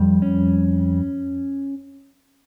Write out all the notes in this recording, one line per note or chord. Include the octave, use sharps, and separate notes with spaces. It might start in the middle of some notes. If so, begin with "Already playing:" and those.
Already playing: F2 G3
C#4